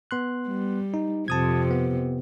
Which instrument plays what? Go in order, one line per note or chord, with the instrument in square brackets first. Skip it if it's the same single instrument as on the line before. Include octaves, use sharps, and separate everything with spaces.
[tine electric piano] B3 C6 F#6
[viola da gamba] G3
[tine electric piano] D#4
[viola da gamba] F2 C3 [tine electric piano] A5 D#6 G#6
[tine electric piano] B3